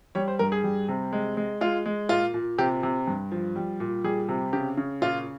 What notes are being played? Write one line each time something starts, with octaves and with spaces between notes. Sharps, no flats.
G3 C#5
C5
G2 A#4
G#4
G3
C3
G#3
G#3
G#3 F4
G#3
A#2 F4
A#2
C3 G4
C3
G2
F3
G3
A#2
G3 G#4
C3
C#3 G4
C#3
A#2 F4